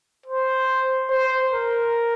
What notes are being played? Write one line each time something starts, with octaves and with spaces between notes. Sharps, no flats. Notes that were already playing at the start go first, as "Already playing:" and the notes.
C5
C5
A#4